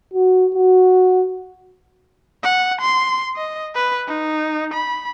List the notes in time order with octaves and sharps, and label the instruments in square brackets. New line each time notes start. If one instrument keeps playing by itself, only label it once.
[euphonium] F#4
F#4
[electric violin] F#5
C6
D#5
B4
D#4
B5